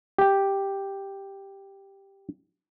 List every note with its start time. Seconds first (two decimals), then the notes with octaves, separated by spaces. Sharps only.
0.18 G4 G5